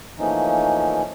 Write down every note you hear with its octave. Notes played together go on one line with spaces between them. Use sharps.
E3 F3 A3 A#3 C#4 D#4